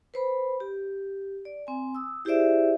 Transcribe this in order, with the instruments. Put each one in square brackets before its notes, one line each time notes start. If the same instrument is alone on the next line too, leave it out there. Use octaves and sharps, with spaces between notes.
[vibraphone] B4 C5 B5
G4
D5
C4 G#5
D#6 E6
E4 G4 G#4 C5 D5 E5